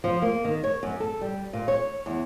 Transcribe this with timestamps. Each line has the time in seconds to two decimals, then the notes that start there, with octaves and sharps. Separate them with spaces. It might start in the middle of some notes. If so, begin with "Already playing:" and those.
0.04 F3
0.22 A#3
0.44 D#3
0.64 C#5
0.83 F#2
1.00 A4
1.21 G3
1.53 A#2
1.68 C#5
2.06 E2